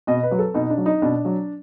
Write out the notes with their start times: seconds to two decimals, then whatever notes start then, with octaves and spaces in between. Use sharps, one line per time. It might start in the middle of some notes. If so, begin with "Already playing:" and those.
0.07 B2 D#5
0.23 B4
0.31 F#3
0.39 A4
0.54 B2 D#4
0.70 D4
0.77 F#3
0.86 D#4
1.02 B2 D4
1.25 F#3